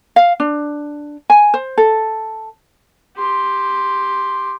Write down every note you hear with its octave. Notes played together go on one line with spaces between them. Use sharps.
F5
D4
G#5
C5
A4
G4 C6